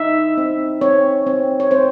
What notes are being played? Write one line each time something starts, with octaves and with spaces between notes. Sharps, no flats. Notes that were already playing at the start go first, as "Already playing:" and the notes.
Already playing: D#4 E5
C4
C4 C#5
C4
C#5
C4 C5